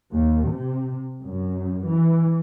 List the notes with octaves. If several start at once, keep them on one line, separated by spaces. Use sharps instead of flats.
D#2
C3
F#2
E3